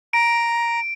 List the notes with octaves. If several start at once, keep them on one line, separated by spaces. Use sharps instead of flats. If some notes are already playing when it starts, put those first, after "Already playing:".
A#5 D7